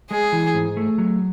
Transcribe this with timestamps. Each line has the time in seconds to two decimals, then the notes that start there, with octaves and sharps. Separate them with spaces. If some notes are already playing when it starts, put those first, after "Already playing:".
0.11 G#3 G#4
0.32 E3
0.54 G#2
0.77 A3
0.98 F#3